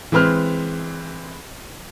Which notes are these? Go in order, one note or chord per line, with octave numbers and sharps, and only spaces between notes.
E3 G#3 C4 B4 F6